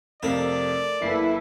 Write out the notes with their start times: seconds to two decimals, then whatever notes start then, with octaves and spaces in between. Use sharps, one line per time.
0.23 F2 C3 A3 A#4 D5 F5
1.02 F#1 A#3 E4 A4 B4 C7